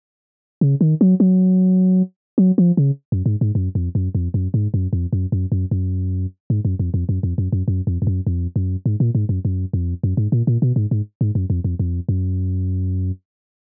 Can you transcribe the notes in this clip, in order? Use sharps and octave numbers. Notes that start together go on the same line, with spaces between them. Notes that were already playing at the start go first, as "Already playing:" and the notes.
C#3
D#3
F#3
F#3
F#3
F3
C#3
F#2
G#2
G#2
F#2
F2
F#2
F2
F#2
G#2
F#2
F2
F#2
F#2
F#2
F#2
G#2
F#2
F2
F2
F#2
F2
F#2
F#2
F#2
F2
F2
F#2
F2
F#2
G#2
A#2
G#2
F#2
F#2
F2
F#2
G#2
A#2
A#2
B2
G#2
G#2
G#2
F#2
F2
F2
F2
F#2